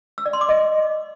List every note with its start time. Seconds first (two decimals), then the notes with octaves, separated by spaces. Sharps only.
0.18 E6
0.26 D5
0.33 C6
0.41 D6
0.49 D#5